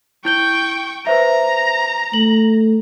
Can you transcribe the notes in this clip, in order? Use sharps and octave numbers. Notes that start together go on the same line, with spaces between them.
E4 G5 C#6 G6 G7
B4 C5 E5 A#5
A3 F#7